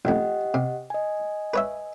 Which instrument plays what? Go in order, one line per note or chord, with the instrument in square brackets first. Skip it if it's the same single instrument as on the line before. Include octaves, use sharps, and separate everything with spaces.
[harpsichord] A1 F2 [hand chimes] G4 D#5 F#5
[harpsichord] C3
[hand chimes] D#5 G#5
[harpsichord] B4 C#5 E5